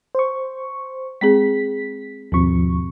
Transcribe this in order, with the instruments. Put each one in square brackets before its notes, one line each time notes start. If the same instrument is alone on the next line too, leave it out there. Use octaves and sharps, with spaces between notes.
[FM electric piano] C5 C#6
[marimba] G#3 C4 G#4 [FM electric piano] B6
[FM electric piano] D#2 F3 C#6 [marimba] G#2 B2 C4